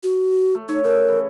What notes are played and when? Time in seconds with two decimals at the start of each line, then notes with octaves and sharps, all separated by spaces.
0.03 F#4
0.55 A3
0.69 D#4 C#5 E5
0.84 C#3 A4 A#4
1.09 E3